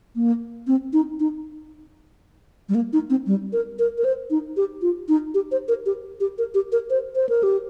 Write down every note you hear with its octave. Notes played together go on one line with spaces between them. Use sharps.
A#3
C4
D#4
D#4
G3
A#3
D#4
C4
G3
A#4
A#4
A#4
C5
D#4
G4
F4
D#4
G4
C5
A#4
G4
G4
A#4
G4
A#4
C5
C5
A#4
G4